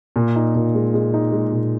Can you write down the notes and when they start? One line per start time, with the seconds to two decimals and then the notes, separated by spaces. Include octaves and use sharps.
0.16 A#2
0.36 D#4
0.55 A#2
0.75 G#3
0.94 G#3
1.14 D#4
1.32 G#3
1.52 A#2